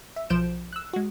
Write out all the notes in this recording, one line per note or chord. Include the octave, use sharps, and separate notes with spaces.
E5
B1 F3 C5 G6 D7 E7
E6 F#6
G#3 F#4